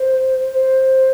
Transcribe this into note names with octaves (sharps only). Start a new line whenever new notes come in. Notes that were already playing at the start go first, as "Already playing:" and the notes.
Already playing: C5
C5